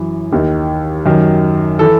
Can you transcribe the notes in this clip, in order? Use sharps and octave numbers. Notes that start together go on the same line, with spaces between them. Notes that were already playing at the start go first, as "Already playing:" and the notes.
Already playing: F#2 E3
D#2 D#3
F#2 D#3
E3 A4